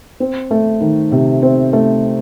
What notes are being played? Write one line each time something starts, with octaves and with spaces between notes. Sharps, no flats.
C4
A3
D#3
C3
C4
A3